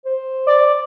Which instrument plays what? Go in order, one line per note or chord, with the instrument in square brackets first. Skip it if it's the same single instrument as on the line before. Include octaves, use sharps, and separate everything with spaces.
[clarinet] C5
[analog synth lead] D5